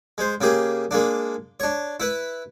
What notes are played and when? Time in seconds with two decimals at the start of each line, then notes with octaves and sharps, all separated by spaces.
0.18 G#3 C5
0.41 C#3 A#3 G4 G#4
0.91 G#3 A#3 D4
1.60 D4 C#5
2.00 E4 B4